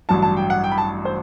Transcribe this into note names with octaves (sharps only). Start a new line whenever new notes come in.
A1 G2 F#3 A5
A5
G5
F#5
G5
B5
A5
C5